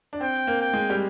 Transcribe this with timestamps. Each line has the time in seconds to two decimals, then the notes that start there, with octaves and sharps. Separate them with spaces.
0.13 D4
0.21 C4 G5
0.47 A#3
0.61 G5
0.74 G#3
0.90 G3